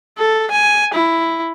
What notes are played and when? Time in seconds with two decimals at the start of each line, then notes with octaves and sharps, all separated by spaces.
0.18 A4
0.51 G#5
0.94 E4